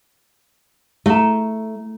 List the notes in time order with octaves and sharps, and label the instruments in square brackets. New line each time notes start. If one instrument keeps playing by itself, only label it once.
[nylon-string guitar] A3 [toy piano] E4 A#5